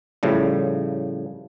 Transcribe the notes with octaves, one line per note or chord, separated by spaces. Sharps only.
A2 C#3 F3 G3